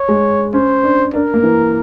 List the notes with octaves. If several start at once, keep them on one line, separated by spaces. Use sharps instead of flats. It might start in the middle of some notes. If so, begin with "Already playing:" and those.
Already playing: C#5
G#3
C#4 C5
D4
D4 A#4
A#3
E3